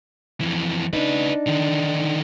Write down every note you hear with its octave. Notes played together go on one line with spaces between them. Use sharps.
F2 E3
C#3 D4 D#4 B4
D3 D#3